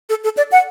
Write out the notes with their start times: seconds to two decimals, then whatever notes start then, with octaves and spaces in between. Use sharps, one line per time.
0.10 A4
0.24 A4
0.37 D5
0.52 F#5